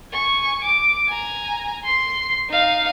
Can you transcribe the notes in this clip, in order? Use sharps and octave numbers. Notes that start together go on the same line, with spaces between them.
G#5 C#6
D6
G#5 A#5
C6 C7
D#4 F5